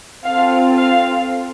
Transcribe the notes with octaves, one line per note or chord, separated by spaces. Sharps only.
C4 F4 A4 F5
F5